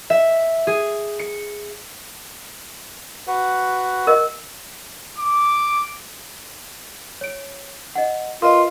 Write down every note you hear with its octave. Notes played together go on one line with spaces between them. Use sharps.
E5
G#4
C#7
F#4 B4 F#5
A#4 D#5
D6
C#5 D7
D#5 F#5
F4 A#4 B4 D#5 C6